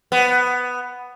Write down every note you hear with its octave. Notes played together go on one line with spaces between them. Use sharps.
B3